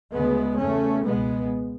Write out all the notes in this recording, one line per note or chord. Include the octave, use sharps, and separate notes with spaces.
D2 C#3 G#3 B3
E2 C#3 A3 C#4
C#2 B2 G#3 B3